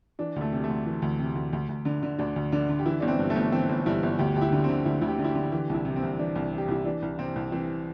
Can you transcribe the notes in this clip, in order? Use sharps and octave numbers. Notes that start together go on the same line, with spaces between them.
E3 D4
D2 A3
C3
A3
D2
E3
D2
C3
D2
D2
D2
D3
D3
D2 D4
D2
D3 D4
D3
G4
E3 E4
G1 D4
C4
G2
A3
G1
E3 C4
G1
G2 E4
G1
D2 G4
D2 G4
E4
D3
C4
D3
D2 E4
D2 E4
G4
D3
E4
G4
D3
E3 G4
C2 E4
C3
C4
C2
E3 D4
C2
C3
G4
C2 E4
E3 D4
C2
C3 C4
C2
E3 C4